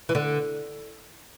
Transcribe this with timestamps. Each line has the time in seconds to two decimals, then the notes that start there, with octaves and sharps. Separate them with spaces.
0.09 E3
0.15 D3